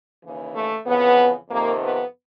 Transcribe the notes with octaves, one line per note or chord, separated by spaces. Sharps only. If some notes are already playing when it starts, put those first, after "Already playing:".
D#2 C#3 E3
A3
F2 C#3 E3 B3
F2 C3 D#3 A#3
B3